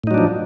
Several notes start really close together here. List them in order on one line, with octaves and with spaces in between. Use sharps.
A2 D#4 F#3 D4 F3